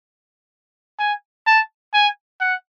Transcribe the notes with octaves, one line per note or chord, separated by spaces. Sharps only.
G#5
A5
G#5
F#5